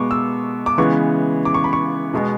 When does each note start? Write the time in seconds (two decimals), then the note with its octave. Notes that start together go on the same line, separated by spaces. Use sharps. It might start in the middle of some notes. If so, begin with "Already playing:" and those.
Already playing: B2 G#3 B3 C#6 D6
0.11 E6
0.66 D6
0.78 C#3 E3 G#3 B3 C#6
1.45 D6
1.54 C#6
1.64 B5
1.73 C#6
2.14 B2 G#3 B3